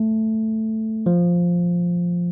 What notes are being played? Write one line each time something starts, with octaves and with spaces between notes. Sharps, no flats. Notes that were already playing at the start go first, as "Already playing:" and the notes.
Already playing: A3
F3